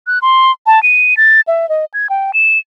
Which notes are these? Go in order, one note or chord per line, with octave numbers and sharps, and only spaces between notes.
F#6
C6
A5
D#7
A6
E5
D#5
G#6
G5
E7